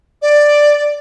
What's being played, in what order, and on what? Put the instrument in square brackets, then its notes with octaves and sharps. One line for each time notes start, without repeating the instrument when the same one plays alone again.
[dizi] D5